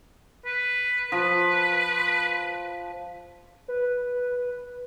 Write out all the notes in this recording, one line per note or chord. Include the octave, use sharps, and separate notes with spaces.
B4
F3 B4
B4